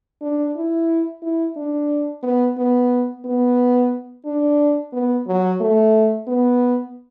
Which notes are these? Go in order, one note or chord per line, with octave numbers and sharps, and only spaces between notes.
D4
E4
E4
D4
B3
B3
B3
D4
B3
F#3
A3
B3